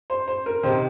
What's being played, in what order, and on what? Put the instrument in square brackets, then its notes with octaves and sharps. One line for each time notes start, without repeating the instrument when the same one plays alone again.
[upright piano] C5
C5
A#4
C3 D#3 C5